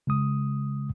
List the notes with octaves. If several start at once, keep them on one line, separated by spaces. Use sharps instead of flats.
C#3 G#3 D#6